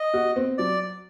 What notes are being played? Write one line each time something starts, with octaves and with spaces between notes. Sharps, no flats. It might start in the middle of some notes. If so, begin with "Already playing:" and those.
Already playing: D#5
F#4
C4
F#3 D5